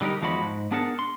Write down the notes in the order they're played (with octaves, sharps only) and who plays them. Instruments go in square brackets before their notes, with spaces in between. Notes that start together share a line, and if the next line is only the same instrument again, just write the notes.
[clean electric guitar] D3 G3 D#4 G4 A#4
E2 F3 G#3 D#4 F#4 B5
G#2
B3 D4 G#4 A#4 F#5 A5
C6